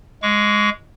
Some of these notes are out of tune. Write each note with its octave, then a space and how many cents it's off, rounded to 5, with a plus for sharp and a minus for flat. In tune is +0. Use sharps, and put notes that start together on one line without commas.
G#3 +0 C#6 +40